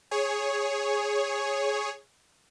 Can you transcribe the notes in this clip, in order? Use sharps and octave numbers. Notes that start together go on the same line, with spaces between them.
G#4 C#5